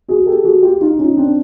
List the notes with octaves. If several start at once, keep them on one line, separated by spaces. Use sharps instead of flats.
F#4 G#4
G4 A4
F#4 G#4
F4 G4
D#4 F4
C#4 D#4
C4 D4